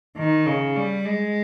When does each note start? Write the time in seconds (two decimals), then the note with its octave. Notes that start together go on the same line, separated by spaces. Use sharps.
0.17 D#3
0.46 C#3
0.76 G3
1.05 G#3